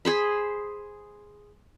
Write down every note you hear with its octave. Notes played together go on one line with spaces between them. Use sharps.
G#4 C5 B5